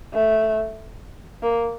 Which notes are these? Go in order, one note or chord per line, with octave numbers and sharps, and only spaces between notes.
A3
A#3